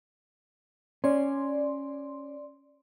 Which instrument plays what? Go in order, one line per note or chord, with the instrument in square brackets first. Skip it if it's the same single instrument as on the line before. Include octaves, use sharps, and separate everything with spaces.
[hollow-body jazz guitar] C#4 [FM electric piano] D5 C6